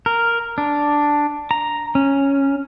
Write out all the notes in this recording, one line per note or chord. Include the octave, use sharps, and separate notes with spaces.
A#4
D4
A#5
C#4